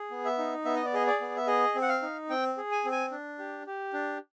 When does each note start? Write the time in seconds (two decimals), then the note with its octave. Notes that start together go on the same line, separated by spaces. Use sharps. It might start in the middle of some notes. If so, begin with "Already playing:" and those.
Already playing: G#4
0.11 B3
0.25 E5
0.38 D#4
0.65 B3 E5
0.76 D#5
0.85 D5
0.94 G#4 D#5
1.07 D5
1.21 B3
1.36 E5
1.47 G#4 D#5
1.75 C4
1.82 F#5
1.89 F5
2.02 D#4
2.30 C4 G5
2.57 G#4
2.72 G#5
2.85 C4
2.92 G#5
3.11 D4
3.39 G4
3.67 G4
3.93 D4